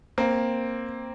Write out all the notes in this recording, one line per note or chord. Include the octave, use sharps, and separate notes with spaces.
A#3 C4